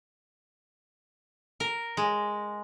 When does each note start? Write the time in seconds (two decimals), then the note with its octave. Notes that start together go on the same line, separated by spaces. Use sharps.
1.60 A#4
1.97 G#3